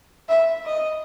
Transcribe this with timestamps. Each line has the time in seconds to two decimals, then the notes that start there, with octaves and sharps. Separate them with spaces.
0.29 E5
0.66 D#5